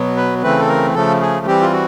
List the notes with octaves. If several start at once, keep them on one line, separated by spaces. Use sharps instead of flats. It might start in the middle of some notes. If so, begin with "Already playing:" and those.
Already playing: B2 F#3 B3
B4
C#3 E3 A3 C4 B4
A4
A#4
C#3 F3 A3 A4
G#4
E3 G3 C4 G4
F4
F#4